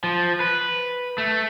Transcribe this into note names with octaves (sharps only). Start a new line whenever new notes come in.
F3
B4
A3